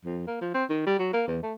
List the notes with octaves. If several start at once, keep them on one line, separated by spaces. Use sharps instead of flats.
F2
A#3
F3
C4
D#3
G3
F#3
A#3
E2
A3